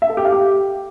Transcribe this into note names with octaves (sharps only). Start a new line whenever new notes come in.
E5
A4
G4
F5
G4